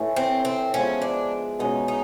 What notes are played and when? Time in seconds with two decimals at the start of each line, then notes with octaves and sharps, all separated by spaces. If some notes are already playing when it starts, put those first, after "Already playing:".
Already playing: A2 E3 A3
0.16 C4
0.45 C4
0.73 F3 G#3 B3 C#4 E4
1.02 D4
1.59 B2 G#3 C#4 D#4
1.88 D#4